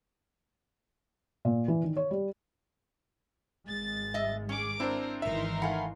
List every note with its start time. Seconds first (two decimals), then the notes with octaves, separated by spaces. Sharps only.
1.45 A#2
1.68 E3
1.83 D#3
1.96 C#5
2.11 G3
3.68 G#1 G#3 A6
4.14 D#5 E5
4.49 C#4 G#4 D6
4.80 C4 D4 E4 A#4 C5
5.22 G#1 E3 D#4 A#4 E5 C6
5.62 A3 F5 F#5 G#5 B5